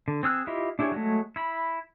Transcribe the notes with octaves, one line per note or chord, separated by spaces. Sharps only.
D3
C4 G#4 E6 F#6
E4 F4 G4 D#5 E5
D4 E4 G4 G#4 C#5
F#3 G#3 A3
E4 B5